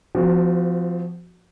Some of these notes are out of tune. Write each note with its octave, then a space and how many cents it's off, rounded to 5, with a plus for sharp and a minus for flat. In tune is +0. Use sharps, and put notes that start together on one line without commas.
F3 +0 C4 -35 F#4 +0